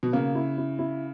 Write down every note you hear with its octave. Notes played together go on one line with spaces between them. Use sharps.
B2
C#3 A#3
E4
E4
E4